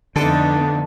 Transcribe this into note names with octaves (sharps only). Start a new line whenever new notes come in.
F2 D3 A3 B3 D4 D#4 A4 D5